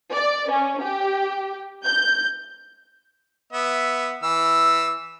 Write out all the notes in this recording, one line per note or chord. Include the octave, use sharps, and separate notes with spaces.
D5
C#4
G4
G6
B3 E5
E3 E6